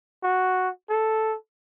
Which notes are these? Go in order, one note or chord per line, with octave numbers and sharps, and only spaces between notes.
F#4
A4